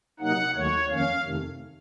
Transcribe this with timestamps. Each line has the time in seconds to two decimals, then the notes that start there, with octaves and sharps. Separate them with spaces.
0.20 C3 F#3 A#3 D#4 F#5
0.55 D#2 D#3 F#3 A3 C#5
0.90 F2 D#3 A#3 C#4 F5
1.24 F2 C3 D#3 A3